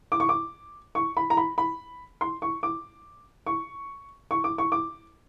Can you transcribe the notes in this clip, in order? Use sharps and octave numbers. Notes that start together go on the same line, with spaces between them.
D6
C#6
D6
C#6
B5
A#5
B5
B5
C6
C#6
D6
C#6
C#6
D6
C#6
D6